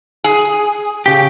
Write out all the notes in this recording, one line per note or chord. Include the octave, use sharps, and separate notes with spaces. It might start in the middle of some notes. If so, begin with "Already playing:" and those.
G#4
C#3 G4